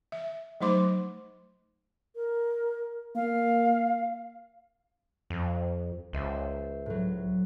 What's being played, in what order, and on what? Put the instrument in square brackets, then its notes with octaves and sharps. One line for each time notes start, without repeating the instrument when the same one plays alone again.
[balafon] E5
F#3 A3 D#4 C5 C6 D6
[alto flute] A#4
[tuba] A#3 [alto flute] F5
[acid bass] F2
[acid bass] C#2 [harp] C5 E5
[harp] A2 F#3